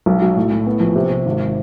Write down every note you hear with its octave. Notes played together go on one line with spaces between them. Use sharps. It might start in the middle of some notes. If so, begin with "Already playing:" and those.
B1
F#3
A2
A2
B3
A#1
C3
C3
G#1